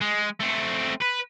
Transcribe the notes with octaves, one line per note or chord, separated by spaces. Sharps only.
G#3
A3 C4
B4